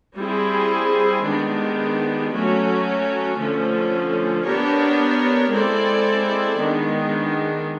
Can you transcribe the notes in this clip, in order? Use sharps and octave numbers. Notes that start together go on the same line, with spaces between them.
G3 C4 E4 G#4
D#3 G#3 B3 D4 G4
F#3 A3 C#4 F#4
D3 F3 A3 C#4
B3 D4 G4 A#4 C#5
G#3 C4 E4 A4 D5
D#3 G#3 B3 D4